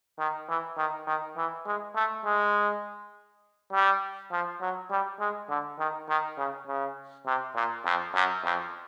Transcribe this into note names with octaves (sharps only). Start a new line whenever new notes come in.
D#3
E3
D#3
D#3
E3
G#3
A3
G#3
G3
F3
F#3
G3
G#3
D3
D#3
D#3
C#3
C#3
C3
A#2
F2
F#2
F2